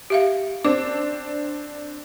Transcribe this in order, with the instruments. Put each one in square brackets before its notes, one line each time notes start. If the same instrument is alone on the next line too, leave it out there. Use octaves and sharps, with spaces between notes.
[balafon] G4 E5 F5
[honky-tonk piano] C4 D4 [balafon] D6